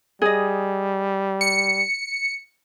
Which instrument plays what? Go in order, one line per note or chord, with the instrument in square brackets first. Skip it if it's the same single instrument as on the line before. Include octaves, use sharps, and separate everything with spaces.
[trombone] G3 [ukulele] G#4 D#5
[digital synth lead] C#7